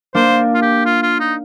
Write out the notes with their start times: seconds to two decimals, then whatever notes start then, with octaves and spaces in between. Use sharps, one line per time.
0.15 A#3 D4 C5
0.54 F4
0.62 G4
0.85 F4
1.03 F4
1.20 D#4